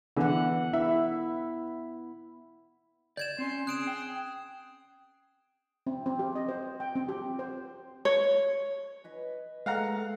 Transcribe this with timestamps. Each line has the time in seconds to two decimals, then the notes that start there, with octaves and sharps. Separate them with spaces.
0.17 D3 E3 B3 F#5
0.73 E4 E5
3.17 D5 G6 G#6 E7
3.39 C4 C#4 C6
3.67 G#4 F#6 D7 E7
3.87 G5
5.87 C4
6.06 C4
6.19 G4
6.36 D#5
6.49 C5
6.80 G5
6.95 C4
7.09 G4
7.39 C5
8.05 C#5
9.04 B4 D#5 B5
9.66 G#3 A3 A#4 F5 F#5 A#5 D6